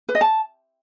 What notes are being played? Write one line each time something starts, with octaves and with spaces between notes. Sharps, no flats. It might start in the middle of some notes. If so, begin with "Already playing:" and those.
B4
D#5
A5